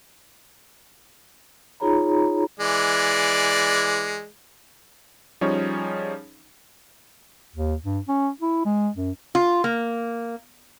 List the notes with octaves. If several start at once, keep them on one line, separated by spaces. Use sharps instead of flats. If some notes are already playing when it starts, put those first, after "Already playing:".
D#4 F4 G#4 C#5 A#5 B5
E3 G#3 D5
F3 G3 C#4 D#4 G#4 C#5
D#2
G2
C#4
E4
G#3
F#2
F4
A#3